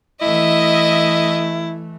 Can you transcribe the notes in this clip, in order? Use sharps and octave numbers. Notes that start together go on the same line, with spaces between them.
E3 A3 E4 D#5 E5